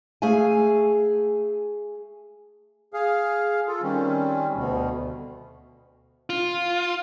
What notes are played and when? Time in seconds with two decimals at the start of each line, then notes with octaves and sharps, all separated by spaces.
0.22 A3 G#4 E5 F5 G#5
2.94 G#4 F5
3.67 F4 A4
3.82 D#3 G3 C4 C#4
4.55 D2 B2
6.30 F4